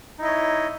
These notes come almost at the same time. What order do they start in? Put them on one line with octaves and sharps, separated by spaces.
D#4 E4 D#5 C#5